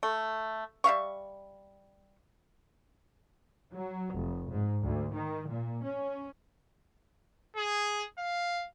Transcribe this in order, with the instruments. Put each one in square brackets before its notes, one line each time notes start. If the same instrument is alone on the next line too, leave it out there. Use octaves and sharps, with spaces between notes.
[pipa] A3
G3 E5 F5 C#6
[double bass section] F#3
F1
G#2
D2
D#3
A#2
C#4
[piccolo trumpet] G#4
F5